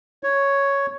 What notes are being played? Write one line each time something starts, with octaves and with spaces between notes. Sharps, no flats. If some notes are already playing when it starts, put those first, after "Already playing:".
C#5